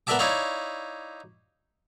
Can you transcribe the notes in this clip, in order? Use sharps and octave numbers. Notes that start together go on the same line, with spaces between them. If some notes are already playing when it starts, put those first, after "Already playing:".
B3 A#4 D5 E5 A5 D6
D#4 E4 C#5 D5 F5